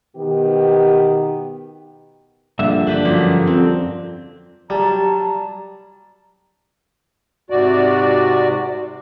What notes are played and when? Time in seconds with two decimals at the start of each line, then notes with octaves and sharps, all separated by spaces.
0.16 B2 D#3 B3 G4
2.59 A#1 G2 D3 E5
2.87 D4 G4 B4
3.05 F#2 F3 A#3
3.47 F2 C4
4.70 F#3 G3 A5 A#5
7.50 G#2 C3 F#4 D5